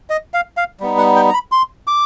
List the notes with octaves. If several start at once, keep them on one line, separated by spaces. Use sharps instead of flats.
D#5
F5
F5
G3 B3 D#4
F#5
G5
A#5
B5
C6
D6